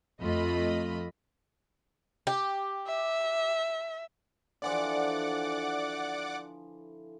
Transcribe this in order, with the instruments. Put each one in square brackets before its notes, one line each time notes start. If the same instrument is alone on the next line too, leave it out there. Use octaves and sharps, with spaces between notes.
[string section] F2 A3 F4 D#5 B5
[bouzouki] G4
[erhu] E5
[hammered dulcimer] D3 E3 F3 [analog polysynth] D5 F#5 D6